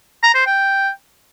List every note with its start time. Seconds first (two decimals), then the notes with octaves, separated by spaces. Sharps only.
0.23 A#5
0.35 C5
0.46 G5